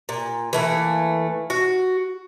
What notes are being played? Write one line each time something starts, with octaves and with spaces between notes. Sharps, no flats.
A#2
E3 A3 A#3
F#4